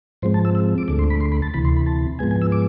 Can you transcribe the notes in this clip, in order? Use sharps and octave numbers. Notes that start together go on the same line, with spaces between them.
G#2 F3 G#3 C4 C5
A5
E6
E6
D6
D2 D3 A3 D6
C6
B5
C6
B5
A5
D2 C3 E3 B5
C6
B5
A5
G#2 F3 G#3 B3 G#5
G#5
E6
D6